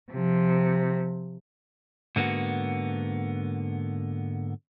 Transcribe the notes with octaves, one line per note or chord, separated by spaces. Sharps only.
C3 F3
G#2 D3 A#3 B3 F#4